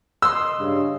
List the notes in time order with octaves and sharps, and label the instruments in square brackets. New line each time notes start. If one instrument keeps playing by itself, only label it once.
[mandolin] D#5 C6 [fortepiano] E6
[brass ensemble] G2 C#3